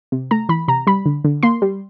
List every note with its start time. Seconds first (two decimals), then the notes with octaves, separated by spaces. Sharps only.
0.12 C3
0.31 A3 A#5
0.49 E3 B5
0.68 C3 A#5
0.87 G3 B5
1.06 D3
1.24 D3
1.43 A#3 C6
1.62 G3